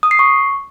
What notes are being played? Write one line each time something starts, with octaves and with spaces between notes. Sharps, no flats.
D#6
C7
C#6